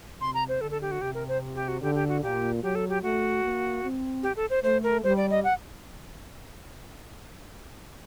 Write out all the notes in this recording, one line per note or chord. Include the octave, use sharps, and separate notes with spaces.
C3 C6
A#5
C5
D3 A4
A4
G4
F#4
C3 G4
A#4
C5
G4
F#4
D3 G4
G4
F#4
A#2 G4
F#3 G4
A4
G4
A3 F#4
A#3
C4
G4
A4
C5
A3 C5
A#4
G3 C5
D5
D#5
F#5